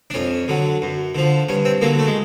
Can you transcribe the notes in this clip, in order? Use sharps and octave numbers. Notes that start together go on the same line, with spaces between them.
D4
F2 C#4
D3 F#3
F#2
D3 F3
G2 C#4
C4
D3 F#3 A#3
A3
G#3